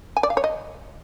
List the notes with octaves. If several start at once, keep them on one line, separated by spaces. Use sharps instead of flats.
G#5
D5
F5
C#5
D#5